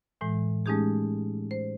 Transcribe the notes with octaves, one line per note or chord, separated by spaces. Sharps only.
A2 E3 G#3
G#3 A3 C#4 D#4 G4 G#4
C5